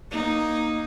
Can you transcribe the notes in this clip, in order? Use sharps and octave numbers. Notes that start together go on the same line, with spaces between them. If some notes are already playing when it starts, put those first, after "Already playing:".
A#3 D#4